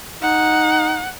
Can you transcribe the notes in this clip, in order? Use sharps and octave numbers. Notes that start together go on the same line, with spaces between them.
D#4 F#5